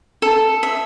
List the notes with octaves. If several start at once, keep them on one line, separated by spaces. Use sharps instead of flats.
A4
E5